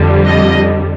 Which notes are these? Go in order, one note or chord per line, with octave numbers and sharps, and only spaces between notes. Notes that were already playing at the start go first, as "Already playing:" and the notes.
Already playing: F2 D3 G3
D#5